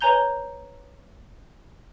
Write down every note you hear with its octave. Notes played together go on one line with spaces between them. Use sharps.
B4 C#5 G#5 A#5 G6 G7